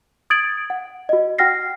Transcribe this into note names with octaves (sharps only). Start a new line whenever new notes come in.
D#6 G#6 A6 D7 F#7
F#5
F#4 D#5
F#4 F#5 G5 F6 A#6 C7